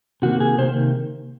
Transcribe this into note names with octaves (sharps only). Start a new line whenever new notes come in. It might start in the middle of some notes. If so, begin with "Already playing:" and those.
C3 D#3 A#3 F#4
G#4
C3 D#3 A#3 C5